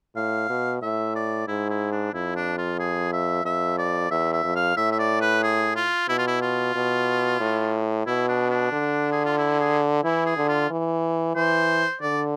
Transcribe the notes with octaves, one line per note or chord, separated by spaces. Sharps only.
A2 F5
B2
A2 E5
D5
G#2 E4
E4
D4
F2 E4
D4
F4
G#4
E5
F2 E5
D5
E2 E5
E5
F2
F5
A2 E5
E5
D5
B4
G#4
F4
B2 E4
F4
E4
F4
B2
A2
B2 E4
D4
D4
D3
G#4
F4
E4
G#4
E3 E4
G#4
D3
F4
E3
E3 C5
D3 D5